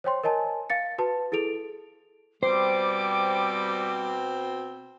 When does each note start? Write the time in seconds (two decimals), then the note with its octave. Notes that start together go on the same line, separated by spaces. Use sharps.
0.04 C5 C#5 G5 C6
0.24 A#4 C#5 D#5 G#5 A5
0.70 F5 A6 C#7
0.98 F#4 B4 A5
1.32 E4 G#4 A4 D7 F7
2.43 B2 G3 C4 C5 D6